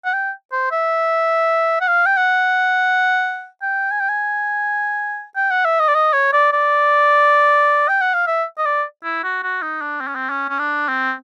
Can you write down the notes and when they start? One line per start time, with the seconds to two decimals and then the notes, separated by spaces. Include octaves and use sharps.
0.05 F#5
0.13 G5
0.52 C5
0.72 E5
1.81 F#5
1.88 F5
2.06 G5
2.17 F#5
3.62 G5
3.91 G#5
4.00 G5
4.09 G#5
5.36 G5
5.51 F#5
5.65 E5
5.79 D#5
5.88 D5
5.94 D#5
6.13 C#5
6.33 D5
6.53 D5
7.88 G5
8.01 F#5
8.14 F5
8.27 E5
8.58 D#5
8.66 D5
9.04 E4
9.24 F#4
9.43 F#4
9.62 D#4
9.81 D4
10.01 C4
10.08 C#4
10.15 C4
10.30 C#4
10.49 C#4
10.59 D4
10.88 C4